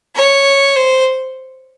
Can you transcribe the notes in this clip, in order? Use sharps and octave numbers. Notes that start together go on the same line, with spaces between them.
C#5
C5